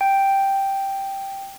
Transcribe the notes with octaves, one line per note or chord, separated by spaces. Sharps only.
G5